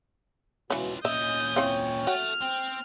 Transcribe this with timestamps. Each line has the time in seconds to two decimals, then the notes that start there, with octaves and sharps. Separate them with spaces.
0.70 B2 E3 C#4 F4 B4
1.05 A#2 C#4 D#5 E5 D#6 G6
1.56 C4 E4 C#5 F5 G5
2.07 A3 F#4 F6
2.42 C4 G5